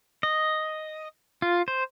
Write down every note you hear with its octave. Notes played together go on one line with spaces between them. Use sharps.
D#5
F4
C5